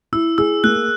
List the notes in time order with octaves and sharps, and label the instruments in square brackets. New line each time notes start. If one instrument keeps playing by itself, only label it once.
[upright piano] E4 [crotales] E6
[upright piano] G#4 [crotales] E6
[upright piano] A#3 [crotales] F#6